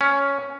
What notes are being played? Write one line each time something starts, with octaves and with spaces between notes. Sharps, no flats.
C#4